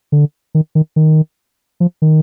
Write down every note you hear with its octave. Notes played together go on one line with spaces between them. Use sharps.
D3
D#3
D#3
D#3
F3
D#3